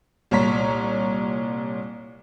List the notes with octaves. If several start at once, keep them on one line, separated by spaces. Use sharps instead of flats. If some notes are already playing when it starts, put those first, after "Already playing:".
C2 A#2 C#5 A#5 B6